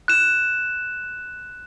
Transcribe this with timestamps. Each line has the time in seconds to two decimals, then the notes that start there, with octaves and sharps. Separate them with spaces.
0.08 F#6 E7